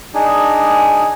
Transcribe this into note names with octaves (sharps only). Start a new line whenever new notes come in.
D4 D#4 G#4